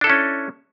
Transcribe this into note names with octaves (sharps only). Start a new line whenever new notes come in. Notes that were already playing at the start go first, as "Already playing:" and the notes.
C#4 D4 E4 A4